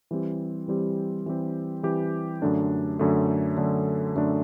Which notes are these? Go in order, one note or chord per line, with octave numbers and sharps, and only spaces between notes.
E3 G3 C4 G4
E3 G3 C4 G4
E3 G3 C4 G4
E3 G3 C4 G4
F#2 D3 A3 D4
F#2 D3 A3 D4
F#2 D3 A3 D4
F#2 D3 A3 D4